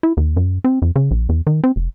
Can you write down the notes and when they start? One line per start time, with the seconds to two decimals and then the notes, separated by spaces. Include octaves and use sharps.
0.03 E4
0.17 D#2
0.37 F#2
0.64 C4
0.82 F2
0.96 C#3
1.11 A#1
1.29 E2
1.47 D#3
1.64 C4
1.76 F1